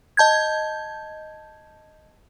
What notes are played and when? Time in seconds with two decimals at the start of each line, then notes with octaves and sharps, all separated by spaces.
0.17 D#5 A5 G6 G#6